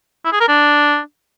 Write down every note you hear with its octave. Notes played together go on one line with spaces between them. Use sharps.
E4
G#4
A#4
D4